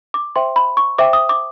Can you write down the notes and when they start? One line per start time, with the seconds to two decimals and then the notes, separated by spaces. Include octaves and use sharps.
0.14 D6
0.36 C5 E5 G5 C6
0.56 B5
0.77 C#6
0.98 C5 E5 G5 D6
1.13 D#6
1.29 D6